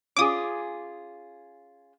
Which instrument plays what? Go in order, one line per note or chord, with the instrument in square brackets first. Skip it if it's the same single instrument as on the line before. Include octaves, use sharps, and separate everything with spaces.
[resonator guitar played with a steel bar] C#4 F4 G#4 [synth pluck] D6 D#6